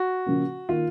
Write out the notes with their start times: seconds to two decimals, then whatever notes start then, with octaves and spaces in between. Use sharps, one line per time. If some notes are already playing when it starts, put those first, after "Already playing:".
Already playing: F#4
0.26 C#3 F3 A#3 C#4
0.69 D#3 A#3 F4